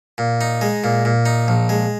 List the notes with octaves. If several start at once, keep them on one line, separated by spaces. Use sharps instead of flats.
A#2
D#4
G#3
A#2
A#2
D#4
A#1
G#3